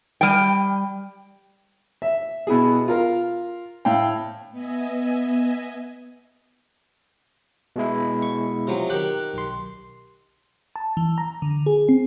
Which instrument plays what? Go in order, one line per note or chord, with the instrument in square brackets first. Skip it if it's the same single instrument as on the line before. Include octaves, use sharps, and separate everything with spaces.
[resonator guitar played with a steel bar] G3 G5
[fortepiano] E5
B2 B3 E4 G#4
F4 A#4 F5
A2 F5 G5
[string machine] B3 D#5 E5 G#5
[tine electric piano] B2 G#3 E4
[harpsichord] C#6
C3 F3 F#3
[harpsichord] D#3 G4 [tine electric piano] F#6
[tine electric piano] B1 C6
[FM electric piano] A5
E3
A#5
D3
G#4
C4